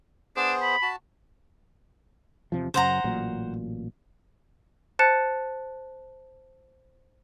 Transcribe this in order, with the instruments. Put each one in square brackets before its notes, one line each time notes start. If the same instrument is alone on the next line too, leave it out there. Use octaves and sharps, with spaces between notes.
[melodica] B3 G#4 C5 [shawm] D4
[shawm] B5
[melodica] F#4 A5
[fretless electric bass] E2 C3 F3
[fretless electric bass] F#2 C#3 [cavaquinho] C5 F#5 A#5
[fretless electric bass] A1 A#2 F#3
[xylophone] C5 A5 F#6 A6 C#7 E7